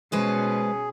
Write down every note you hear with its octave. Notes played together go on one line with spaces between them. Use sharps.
B2 G#3 C#4 G#4 B4 C5